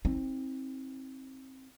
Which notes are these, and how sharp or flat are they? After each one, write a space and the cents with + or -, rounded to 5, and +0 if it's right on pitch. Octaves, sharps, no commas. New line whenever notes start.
C4 +15 D#4 +40